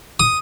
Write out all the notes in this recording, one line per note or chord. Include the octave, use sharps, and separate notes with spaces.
D#6